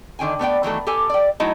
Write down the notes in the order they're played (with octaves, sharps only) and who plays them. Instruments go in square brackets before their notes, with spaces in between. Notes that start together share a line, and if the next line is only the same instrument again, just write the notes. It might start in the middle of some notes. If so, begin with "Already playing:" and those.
[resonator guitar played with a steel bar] D3 D#3 G5 G#5
A3 B3 D5 G5
D#3 E3 F#3 A3
G4 A4 G#5
D5 G5
F#3 A3 D#4 E4 D#5